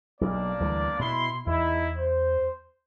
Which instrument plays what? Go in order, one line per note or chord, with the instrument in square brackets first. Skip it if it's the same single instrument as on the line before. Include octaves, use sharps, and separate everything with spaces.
[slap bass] B1 [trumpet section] A#3 D4 D5
[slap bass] D2 E3 G3
[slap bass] B2 [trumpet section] E4 C6
[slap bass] E2 [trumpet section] D#4 E4
[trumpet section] C5